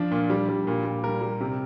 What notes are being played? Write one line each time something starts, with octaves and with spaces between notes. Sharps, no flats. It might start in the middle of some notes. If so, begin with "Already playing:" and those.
Already playing: F3 D4
A#2
G3
G3
A#2
A#2
G3 A#4
G3
C3